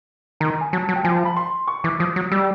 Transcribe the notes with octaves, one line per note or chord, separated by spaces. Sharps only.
D#3 A#5
G#5
F#3 A5
F#3
G5
F3 G#5
A5
B5
C6
C#6
E3 D6
F3 D#6
F#3
G3 E6